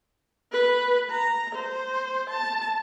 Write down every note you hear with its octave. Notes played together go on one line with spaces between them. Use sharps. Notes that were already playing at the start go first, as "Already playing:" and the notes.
B4
A#5
C5
A5